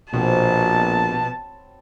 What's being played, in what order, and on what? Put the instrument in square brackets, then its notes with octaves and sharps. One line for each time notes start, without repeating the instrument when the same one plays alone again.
[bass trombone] A#1 [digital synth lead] B2 [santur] F#3 C4 B5 [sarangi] A5